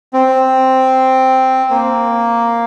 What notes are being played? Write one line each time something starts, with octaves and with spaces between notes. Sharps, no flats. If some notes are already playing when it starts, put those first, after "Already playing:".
C4
A#3